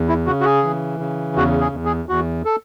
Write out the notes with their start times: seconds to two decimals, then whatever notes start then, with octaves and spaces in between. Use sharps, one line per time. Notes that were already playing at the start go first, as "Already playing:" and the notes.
Already playing: E2
0.09 E4
0.26 C#3 F#4
0.40 F#4
0.45 G#4
0.63 E3
0.99 C#3
1.36 E2 F#4
1.60 G#4
1.72 E2
1.85 G#4
2.09 E2 F#4
2.45 A4